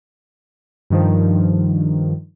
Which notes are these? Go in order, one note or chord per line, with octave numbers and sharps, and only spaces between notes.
G2 D#3 F3